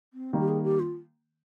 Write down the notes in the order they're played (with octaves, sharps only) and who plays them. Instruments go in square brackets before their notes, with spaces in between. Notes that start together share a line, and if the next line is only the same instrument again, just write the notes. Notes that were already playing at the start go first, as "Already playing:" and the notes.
[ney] C4
[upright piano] D#3 G3 A#3
[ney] G4
G#4
G4
F4